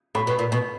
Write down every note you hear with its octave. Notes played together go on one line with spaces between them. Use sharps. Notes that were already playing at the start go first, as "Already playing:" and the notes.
A2 B5
B2
A#2
B2